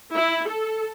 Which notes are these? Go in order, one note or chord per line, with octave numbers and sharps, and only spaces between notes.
E4
A4